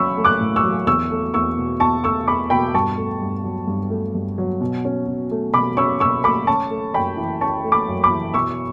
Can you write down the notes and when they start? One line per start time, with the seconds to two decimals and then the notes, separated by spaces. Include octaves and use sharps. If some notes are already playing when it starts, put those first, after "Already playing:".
Already playing: F#3 C#4 B5 C#6 E6
0.17 A3
0.25 D6 F#6
0.41 A2
0.56 C#6 E6
0.63 F#3
0.87 E2 C#6 E6
1.11 A3
1.34 E2 C#6 E6
1.57 B2
1.80 E2 A5 C#6
2.03 A3 C#6 E6
2.27 E2 B5 D6
2.50 B2 G5 B5
2.74 G2 A5 C#6
2.97 A3
3.21 G2
3.44 F#3
3.68 G2
3.90 A3
4.15 G2
4.38 F#3
4.61 B2
4.85 C#4
5.07 B2
5.31 A3
5.54 B2 B5 D6
5.77 C#4 C#6 E6
6.00 B2 C#6 E6
6.24 A3 B5 D6
6.47 C#4 A5 C#6
6.70 A3
6.94 F#2 G5 B5
7.17 E3
7.41 C#4 A5 C#6
7.64 A3
7.72 B5 D6
7.88 F#2
8.04 B5 D6
8.11 E3
8.34 B2 C#6 E6